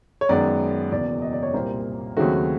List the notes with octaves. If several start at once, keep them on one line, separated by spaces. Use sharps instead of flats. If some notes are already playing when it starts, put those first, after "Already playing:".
C#5
F#2 D#3 G#3 B3 D5
F#1 E2 B2 D5
D#5
D5
C#5
C2 A#2 G3 A#3 C5
D#2 C#3 F#3 A3 C4 F#4